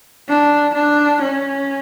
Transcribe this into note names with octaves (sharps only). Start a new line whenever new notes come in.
D4
D4
C#4